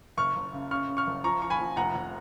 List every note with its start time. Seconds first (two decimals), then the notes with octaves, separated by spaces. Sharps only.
0.17 F#1 C#6 F6
0.36 F#1
0.53 C#3
0.71 C#3 C#6 F6
0.89 C#3
0.97 C#6 F6
1.07 F#1
1.24 F3 A#5 C#6
1.42 F3 C#6
1.50 G#5 B5
1.60 F3
1.76 F1 F#5 A#5
1.95 F1